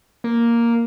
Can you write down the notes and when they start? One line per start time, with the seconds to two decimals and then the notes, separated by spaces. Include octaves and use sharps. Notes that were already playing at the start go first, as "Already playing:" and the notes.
0.24 A#3